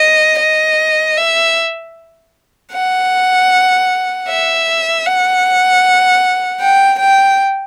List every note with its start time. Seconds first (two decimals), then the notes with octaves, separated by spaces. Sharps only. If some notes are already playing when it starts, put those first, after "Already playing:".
Already playing: D#5
0.39 D#5
1.17 E5
2.73 F#5
4.29 E5
5.06 F#5
6.61 G5
7.00 G5